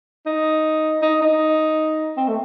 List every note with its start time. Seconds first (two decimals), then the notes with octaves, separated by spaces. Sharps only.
0.26 D#4
1.02 D#4
1.21 D#4
2.17 C4
2.28 A3